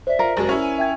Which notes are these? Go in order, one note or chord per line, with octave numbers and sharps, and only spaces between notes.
C5 D5 E5
F4 A#4
F#1 G#3 F#4
C#4 E4
G#5
E5 G5 G#6